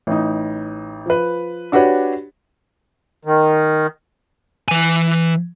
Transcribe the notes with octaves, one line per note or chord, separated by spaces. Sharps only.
A1 D#4
F3 B4
D4 F#4 G4 B4 C#5
D#3
E3 G#5